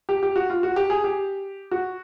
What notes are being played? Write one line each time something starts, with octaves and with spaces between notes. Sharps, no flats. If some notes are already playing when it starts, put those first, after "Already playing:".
G4
G4
F#4
F4
F#4
G4
G#4
G4
F#4